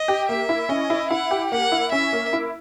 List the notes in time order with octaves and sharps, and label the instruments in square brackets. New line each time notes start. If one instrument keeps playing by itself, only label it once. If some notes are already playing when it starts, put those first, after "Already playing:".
Already playing: [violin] D#5
[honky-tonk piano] G4
[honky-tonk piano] A#3 [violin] E5
[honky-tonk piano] E4
[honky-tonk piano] C#4 [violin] D#5
[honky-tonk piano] E4
[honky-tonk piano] E4 [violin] F#5
[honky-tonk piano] G4
[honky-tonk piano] A#3 [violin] F#5
[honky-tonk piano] E4
[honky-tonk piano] C#4 [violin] E5
[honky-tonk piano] A#3
E4